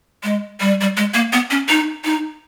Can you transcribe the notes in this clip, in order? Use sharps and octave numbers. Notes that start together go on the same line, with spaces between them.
G#3
G3
G3
G#3
A#3
B3
C#4
D#4
D#4